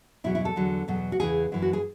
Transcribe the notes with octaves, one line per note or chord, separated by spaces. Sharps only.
E2 B2 F#3 E4
E4
A4
E2 D3 F#3
E2 B2 F#3
F#4
E2 C#3 E3 G#4
F#2 E3
F#4
G#4